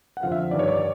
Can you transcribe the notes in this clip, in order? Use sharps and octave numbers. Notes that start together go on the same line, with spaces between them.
F#5
F2 D3 F3 F5
E5
G2 D#3 D5
C#5
D5